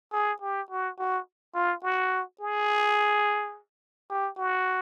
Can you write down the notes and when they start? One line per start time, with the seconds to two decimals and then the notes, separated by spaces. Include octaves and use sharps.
0.13 G#4
0.42 G4
0.71 F#4
0.99 F#4
1.55 F4
1.83 F#4
2.40 G#4
4.10 G4
4.37 F#4